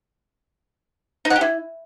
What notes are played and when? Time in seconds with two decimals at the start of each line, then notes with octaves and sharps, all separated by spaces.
1.25 D#4
1.30 F#5
1.36 G4
1.41 E4